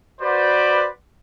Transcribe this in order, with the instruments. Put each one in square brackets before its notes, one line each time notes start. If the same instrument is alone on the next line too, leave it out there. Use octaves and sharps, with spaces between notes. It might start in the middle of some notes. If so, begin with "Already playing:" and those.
[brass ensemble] F#4 B4 C5 D5